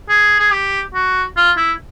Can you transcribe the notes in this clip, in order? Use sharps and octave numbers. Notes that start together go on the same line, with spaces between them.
G#4
G#4
G4
F#4
F4
E4